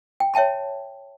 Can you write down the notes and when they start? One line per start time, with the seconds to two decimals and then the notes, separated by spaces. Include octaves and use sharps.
0.20 G5
0.34 C#5 E5 G5 A5 B5